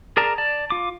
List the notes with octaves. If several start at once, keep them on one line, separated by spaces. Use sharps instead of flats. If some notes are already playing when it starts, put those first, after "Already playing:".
G#4 A#4 D5 A5 A#5
D5 A5
F4 D6